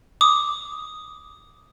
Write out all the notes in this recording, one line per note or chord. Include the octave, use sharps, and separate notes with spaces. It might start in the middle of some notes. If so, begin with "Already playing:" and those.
D6 D#6